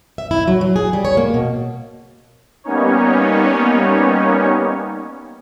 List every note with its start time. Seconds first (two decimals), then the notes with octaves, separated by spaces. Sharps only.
0.18 E5
0.31 E4
0.47 F#3
0.61 F#3
0.76 G#4
0.93 G3
1.05 C#5
1.17 A#3
1.34 B2
2.64 G3 A#3 B3 C#4 D#4 C#5